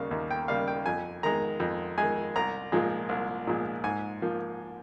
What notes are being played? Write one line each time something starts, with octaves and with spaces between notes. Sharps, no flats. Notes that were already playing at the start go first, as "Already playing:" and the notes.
Already playing: D#2 C#3 G3 A#3 F5
D#2
G5
C#3 G3 A#3 F5
G5
F2 G#5
D#3 G#3 A#5
F2
D#3 G#3 G#5
C2 A#5
A#2 F3 G#3
C2
A#2 F3 G#3
G#2 G#5
F3 A#3